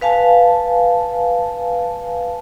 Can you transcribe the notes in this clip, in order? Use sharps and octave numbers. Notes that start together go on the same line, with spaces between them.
B4 F5 G#5 A5